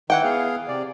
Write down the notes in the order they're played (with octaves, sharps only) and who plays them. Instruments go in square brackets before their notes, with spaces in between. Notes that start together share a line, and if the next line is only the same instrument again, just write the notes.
[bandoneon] D#3 [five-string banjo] E3 F#5 G5
[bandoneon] B3 G#4 F5
C3 D5